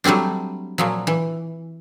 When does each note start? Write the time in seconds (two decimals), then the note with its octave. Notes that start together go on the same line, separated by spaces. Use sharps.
0.04 F#3 G3 A3 C4 D4
0.78 A#2 F3 F#3
1.07 E3